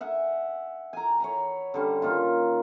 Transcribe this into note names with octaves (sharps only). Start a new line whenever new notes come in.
E5 F#5 G#5
G#5 A#5
C#5 A#5 B5
D3 G3 C#4
D#3 A#3 F4